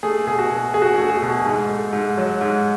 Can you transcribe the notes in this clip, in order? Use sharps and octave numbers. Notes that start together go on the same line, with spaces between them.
A3 G#4
B2 G#4
F#4
B2
A3 G#4
F#4
A3 F#4
G#4
B2
G#2
A3
G#2
F#3
G#2